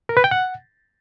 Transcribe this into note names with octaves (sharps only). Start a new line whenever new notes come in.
A#4
B4
G5
F#5